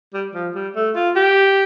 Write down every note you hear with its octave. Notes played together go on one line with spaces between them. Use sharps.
G3
F3
G3
A3
F4
G4